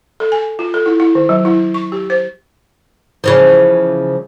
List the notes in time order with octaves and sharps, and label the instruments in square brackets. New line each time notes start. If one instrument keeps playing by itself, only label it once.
[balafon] A4
G#5
F4
A4
E4
E4
D#3
F#3
E4
C#6
G4
C5
[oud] C#3 E3 F3